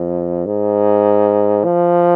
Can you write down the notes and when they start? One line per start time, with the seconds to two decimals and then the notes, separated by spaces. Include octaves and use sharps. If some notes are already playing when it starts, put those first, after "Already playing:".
Already playing: F2
0.46 G#2
1.64 F3